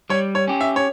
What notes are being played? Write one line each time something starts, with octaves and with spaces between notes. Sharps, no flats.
G3 C#5
C#5
C#4 G4
E5
C#5